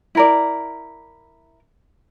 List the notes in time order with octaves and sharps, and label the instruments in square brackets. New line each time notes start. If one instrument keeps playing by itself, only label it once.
[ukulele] E4 A#4 D5